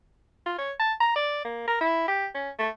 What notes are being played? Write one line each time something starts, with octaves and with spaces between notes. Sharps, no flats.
F4
C#5
A5
A#5
D5
A#3
A#4
E4
G4
C#4
A3